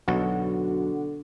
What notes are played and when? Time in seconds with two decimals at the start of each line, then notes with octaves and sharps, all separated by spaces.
0.08 B1 D3 F#4